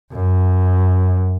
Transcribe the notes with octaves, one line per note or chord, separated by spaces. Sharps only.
F#2